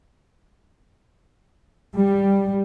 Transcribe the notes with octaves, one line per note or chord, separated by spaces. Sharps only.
G3